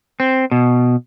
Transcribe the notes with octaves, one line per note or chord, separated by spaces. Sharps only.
C4
B2